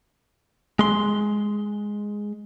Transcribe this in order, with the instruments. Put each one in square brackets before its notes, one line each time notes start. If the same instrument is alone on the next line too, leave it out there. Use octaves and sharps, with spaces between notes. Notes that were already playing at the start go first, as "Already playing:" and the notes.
[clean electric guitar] G#3 C6